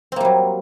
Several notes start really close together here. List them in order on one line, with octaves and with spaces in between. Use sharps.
C4 A#3 G3 F#3